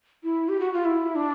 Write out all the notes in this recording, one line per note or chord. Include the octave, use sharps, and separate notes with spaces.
E4
G4
F#4
F4
E4
D4